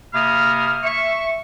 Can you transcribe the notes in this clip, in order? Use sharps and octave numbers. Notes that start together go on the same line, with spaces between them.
C3 A#3 B5 D#6 F6
E5 C#6